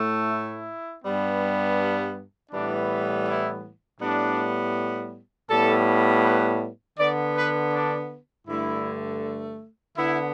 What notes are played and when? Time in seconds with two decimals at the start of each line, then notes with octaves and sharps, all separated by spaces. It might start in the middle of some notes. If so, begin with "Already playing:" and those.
Already playing: A2 A3
0.29 E4
1.04 G2 G3 B3
2.52 A2 E3 G3 B3 D4
3.27 E4
4.01 A2 G3 B3 D4
5.50 A2 G3 B3 A4
6.24 B4
6.99 D3 B3 D5
7.36 B4
7.73 D4
8.47 G2 D3 A3 E4
9.96 D3 B3 E4